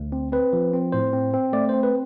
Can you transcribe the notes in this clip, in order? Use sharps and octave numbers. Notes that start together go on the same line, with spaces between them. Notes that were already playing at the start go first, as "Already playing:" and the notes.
Already playing: D2
C4
C4 B4
F3
C4
A2 C5
C4
C4
A3 D5
C4 C5
B4